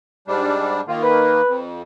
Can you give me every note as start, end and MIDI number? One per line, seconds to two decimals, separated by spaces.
0.28 0.80 44
0.28 0.81 55
0.28 0.81 62
0.88 1.41 51
0.88 1.41 58
0.88 1.00 65
1.03 1.58 71
1.48 1.82 41